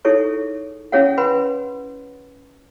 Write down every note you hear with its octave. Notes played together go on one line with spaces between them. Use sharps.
D#4 E4 G#4 A4 C#5 C#6
C#4 E4 G#4 C#5 F5 F#5
B4 F#5 G#5 B5 C6